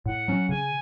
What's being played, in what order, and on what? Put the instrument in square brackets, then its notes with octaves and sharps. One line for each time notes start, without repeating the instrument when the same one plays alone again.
[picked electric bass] A2 [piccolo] F#5
[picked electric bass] F#3 C#4
[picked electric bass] C#3 [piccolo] G#5